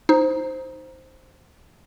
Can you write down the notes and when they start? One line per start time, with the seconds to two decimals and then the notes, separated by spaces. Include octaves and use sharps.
0.09 D#4 C5